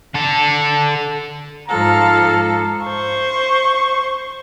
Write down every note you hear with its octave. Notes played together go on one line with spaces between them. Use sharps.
D3 A4
G#2 F3 A4 F5 A#5
C5 C#6